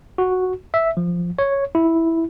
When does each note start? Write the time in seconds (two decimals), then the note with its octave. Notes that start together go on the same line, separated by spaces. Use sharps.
0.18 F#4
0.74 E5
0.97 F3
1.39 C#5
1.75 E4